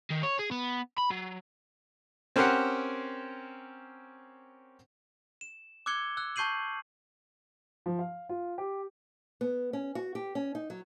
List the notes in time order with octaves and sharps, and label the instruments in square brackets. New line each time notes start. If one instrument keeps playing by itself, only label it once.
[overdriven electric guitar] D#3
C#5
G#4
B3
B5
F#3
[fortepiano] C4 C#4 G4 A#4 C5 F#5
[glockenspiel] E7
D6 E6 F#6 G#6 C#7 G7
E6 F#6
A5 C#6 G6 C7 D#7 F#7
[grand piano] F3
F5
F4
G4
[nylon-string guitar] B3
C#4
F#4
G4
C#4
D#4
F#3